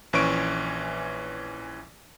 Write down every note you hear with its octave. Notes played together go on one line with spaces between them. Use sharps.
A#1 E3 C#4 C#6 D7